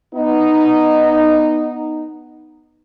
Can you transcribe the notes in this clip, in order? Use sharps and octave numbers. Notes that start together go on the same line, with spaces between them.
B3 D#4